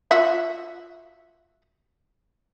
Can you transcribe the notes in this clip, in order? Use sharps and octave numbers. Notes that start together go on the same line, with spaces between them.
F4 F#4 E5